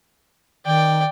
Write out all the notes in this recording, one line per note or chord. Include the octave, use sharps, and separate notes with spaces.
D#3 D5 G5